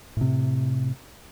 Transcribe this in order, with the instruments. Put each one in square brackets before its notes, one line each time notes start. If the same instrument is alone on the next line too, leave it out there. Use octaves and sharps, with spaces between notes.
[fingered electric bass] A2 C3